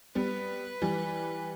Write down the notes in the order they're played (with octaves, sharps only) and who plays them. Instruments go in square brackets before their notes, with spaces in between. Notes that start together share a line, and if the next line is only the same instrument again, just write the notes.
[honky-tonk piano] G3 B3 [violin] B4
[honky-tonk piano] E3 G3